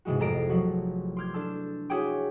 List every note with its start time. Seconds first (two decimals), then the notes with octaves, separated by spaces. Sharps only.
0.05 G#2 C3 E3 G#3 F#4
0.19 A1 F2 A4 A#5 C7 D7
0.49 F3 F#3 F#4
1.17 C6 D6 F6 G6 G#6
1.34 D4 A4 A5 E6
1.90 E4 F#4 G#4 C#5 G5 D6